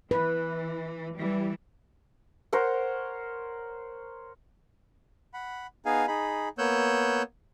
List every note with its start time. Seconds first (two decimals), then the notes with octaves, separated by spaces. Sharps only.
0.11 E3 B4
1.15 E3 G3
2.53 A#4 C5 C#5 F#5
5.34 F#5 B5
5.86 B3 D#4 G#4 F5 G#5
6.08 D#4 G#4 B5
6.58 A#3 B3 C#5 E6 F#6 G6